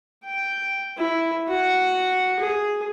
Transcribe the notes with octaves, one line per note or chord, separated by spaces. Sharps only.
G5
E4
F#4 F#5
G#4